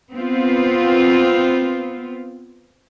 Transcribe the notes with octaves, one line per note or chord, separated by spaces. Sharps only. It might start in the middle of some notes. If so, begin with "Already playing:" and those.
B3 C4 F4